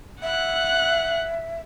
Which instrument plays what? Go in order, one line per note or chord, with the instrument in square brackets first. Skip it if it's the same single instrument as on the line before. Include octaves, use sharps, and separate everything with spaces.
[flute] E5 [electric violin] F#5 F#6